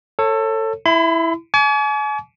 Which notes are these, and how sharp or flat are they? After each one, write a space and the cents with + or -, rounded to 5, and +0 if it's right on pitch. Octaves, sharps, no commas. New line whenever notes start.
A4 +20 C#5 -20
E4 +0 B5 +45
G#5 +40 D6 -45